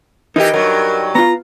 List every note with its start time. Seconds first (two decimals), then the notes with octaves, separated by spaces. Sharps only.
0.36 E3 D#4 G4 A#4 D#5
0.54 G2 F#3 A#4
1.15 B3 F4 A#5